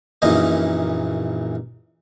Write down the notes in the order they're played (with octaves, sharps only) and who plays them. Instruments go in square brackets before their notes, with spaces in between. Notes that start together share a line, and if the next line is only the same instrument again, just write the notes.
[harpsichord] A#1 F#2 A#2 E3 D#4 D#5